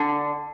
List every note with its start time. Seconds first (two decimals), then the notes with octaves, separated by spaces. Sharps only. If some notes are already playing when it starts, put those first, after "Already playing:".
Already playing: D3